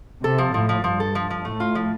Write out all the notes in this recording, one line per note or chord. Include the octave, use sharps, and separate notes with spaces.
C3 A4
F3
A2 F3
F3
G2 F3
A4
F3
F3
A2 A3
F4
F3